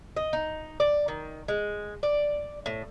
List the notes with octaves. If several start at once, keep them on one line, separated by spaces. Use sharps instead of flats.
D#5
D#4
D5
D#3
G#3
D5
A2